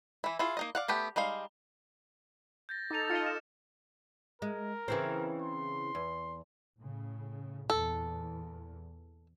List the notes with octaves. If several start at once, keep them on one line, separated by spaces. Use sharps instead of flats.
E3 E4
E4 F4 G#4
A#3 D#4 D#5
D5 F5 F#5
A3 B3 G4 G5
G3 G#3 D#4 F5
G6 A6 A#6
D#4 A4 D6 A6 F7
F4 D#5 F6 C#7
E7
G#3 A#4
C#3 E3 C4
C6
E2
A2 C#3
E2 A#2 A4